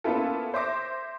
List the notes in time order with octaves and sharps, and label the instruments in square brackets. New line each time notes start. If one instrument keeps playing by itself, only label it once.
[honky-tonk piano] A#3 B3 C#4 E4 F4 A4
C5 E5 D6 A#6